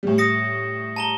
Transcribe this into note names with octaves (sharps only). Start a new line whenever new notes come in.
A2 G3
D#6 A#6 C#7
A5 A#5 G7